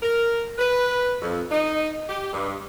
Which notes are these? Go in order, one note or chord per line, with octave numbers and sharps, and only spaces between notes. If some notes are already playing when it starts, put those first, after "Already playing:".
A#4
B4
F2
D#4
G4
G2